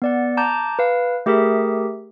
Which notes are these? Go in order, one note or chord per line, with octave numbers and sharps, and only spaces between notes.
B3 D5 F#5
A5 A#5 D6 G6
B4 F5
A3 G4 G#4 A#4 E5